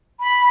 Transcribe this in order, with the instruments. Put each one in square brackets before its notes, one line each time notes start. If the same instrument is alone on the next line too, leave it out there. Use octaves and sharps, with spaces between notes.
[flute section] B5